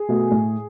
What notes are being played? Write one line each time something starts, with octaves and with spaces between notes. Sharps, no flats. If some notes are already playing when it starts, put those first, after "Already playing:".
Already playing: G#4
B2 A3
A2